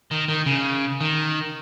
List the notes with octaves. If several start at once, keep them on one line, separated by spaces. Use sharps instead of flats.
D#3
D#3
C#3
D#3